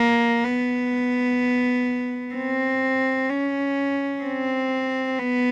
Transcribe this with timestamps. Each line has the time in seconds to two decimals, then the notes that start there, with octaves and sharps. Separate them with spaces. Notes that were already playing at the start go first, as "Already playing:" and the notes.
Already playing: A#3
0.44 B3
2.35 C4
3.29 C#4
4.23 C4
5.19 B3